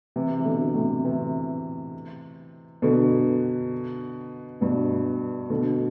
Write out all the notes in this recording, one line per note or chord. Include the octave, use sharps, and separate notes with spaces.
C3 E3
E3
B2 D3
A2 C3
C3 E3
B2 D3
G2 B2
B2 D3